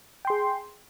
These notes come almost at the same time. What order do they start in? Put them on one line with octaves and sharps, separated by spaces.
G5 C6 G#4